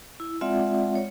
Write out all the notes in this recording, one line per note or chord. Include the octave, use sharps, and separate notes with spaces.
E4
G#3 C4 F4 D5 E5 F#5
C#5